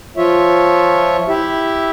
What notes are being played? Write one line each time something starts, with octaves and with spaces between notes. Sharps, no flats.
F3 F4 C#5 E5
E4 G4 E5